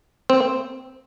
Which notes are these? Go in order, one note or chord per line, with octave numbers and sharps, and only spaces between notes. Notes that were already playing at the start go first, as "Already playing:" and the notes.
C4